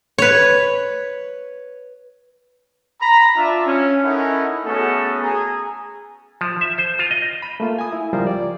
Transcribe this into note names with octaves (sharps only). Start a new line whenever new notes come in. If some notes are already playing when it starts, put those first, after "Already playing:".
B4 C#5
A#5 B5
D4 F4 E5
C#4
C#4 D#4 E4 A4 A#4 F#5
A3 B3 C#4 F#4 G#4 A4
G#4 G#5 A#5
F3
E5
C5
F4
D#5
B5
A3 A#3 F4
G#5 D#6
E4
C#2 F3 G3 F4 A#4 C5
D5